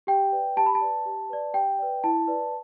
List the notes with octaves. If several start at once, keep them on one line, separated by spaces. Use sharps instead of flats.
G4 G5
B4 D5
G4 A5
B5
A5
B4 D5
G4
B4 D5
G4 G5
B4 D5
E4 A5
B4 D5